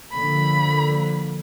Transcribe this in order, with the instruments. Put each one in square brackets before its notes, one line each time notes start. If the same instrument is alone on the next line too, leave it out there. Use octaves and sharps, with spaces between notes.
[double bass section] D3 F3 A#3 [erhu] B5